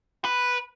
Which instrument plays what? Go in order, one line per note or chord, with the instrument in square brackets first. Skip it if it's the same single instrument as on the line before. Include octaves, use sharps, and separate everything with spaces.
[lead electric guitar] B4